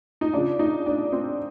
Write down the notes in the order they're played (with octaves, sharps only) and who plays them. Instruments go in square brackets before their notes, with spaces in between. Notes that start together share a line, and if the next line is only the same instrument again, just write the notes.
[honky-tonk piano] D#4
C#3 F3 D4
D#4
D4
C4